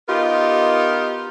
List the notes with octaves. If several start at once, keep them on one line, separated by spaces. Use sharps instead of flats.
B3 D#4 F4 G4 A#4